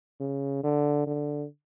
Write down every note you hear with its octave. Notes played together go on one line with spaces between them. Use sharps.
C#3
D3
D3